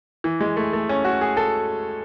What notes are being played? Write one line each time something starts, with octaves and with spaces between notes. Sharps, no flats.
E3
G#3
A3
A3
C#4
F#4
G#4
A4